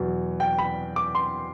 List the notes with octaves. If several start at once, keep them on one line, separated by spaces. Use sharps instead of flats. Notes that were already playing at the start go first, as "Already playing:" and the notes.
Already playing: E2 B2 F#3
G5
B5
D6
C6